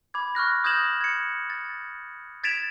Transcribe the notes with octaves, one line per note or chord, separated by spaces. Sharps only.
B5 D6 G#6
C#6 F6 F#6 A#6
D#6 G6 G#6 A#6 E7 F#7
G#6 C#7
A6
G#6 A6 B6 D7 E7 F7